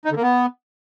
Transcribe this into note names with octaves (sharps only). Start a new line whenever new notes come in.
D#4
D3
A#3
B3